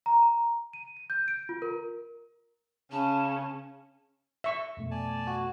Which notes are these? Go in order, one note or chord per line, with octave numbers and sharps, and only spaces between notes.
A#5
D#7
D#7
G6
D7
F4
A#4
C#3 C#4 A5
E5 C#6
F2 B2 A3
D5 G#5 A5
F#4